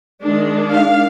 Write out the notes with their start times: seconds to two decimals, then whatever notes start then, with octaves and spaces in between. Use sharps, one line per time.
0.21 D#3 G#3 D4
0.71 F5